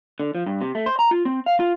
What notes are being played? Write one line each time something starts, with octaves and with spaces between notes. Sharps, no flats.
D3
F3
G2
C3
A3
C5
A#5
F4
C4
F5
F4